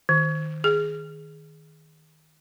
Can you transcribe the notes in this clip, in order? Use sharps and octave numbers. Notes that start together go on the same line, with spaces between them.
D#3
G#4